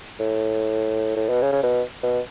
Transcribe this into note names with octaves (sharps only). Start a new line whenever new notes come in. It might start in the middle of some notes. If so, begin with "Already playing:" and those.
A2
A2
B2
C#3
C#3
B2
B2